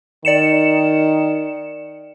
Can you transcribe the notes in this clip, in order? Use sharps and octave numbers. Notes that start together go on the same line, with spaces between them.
D#3 D5 C#7 E7